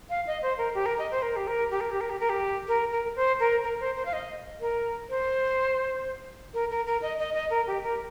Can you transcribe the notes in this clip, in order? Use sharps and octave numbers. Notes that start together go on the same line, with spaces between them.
F5
D#5
C5
A#4
G4
A#4
D#5
C5
A#4
G4
A#4
G4
A#4
G4
A#4
G4
A#4
G4
A#4
A#4
C5
A#4
A#4
C5
C5
F5
D#5
A#4
C5
A#4
A#4
A#4
D#5
D#5
D#5
A#4
G4
A#4